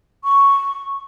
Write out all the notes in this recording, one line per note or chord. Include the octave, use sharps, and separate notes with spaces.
C#6